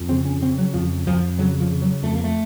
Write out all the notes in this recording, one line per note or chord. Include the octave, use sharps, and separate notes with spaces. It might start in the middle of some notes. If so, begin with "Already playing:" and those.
Already playing: F2
C#3 C4
C#4
C#3 C4
F#3
F2 F3
F2 F3
C#3 F#3
F3
C#3
F#3
F2 A3
A#3
A3